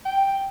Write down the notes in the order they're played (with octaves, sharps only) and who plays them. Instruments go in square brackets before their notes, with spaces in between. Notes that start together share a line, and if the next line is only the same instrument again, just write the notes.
[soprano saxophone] G5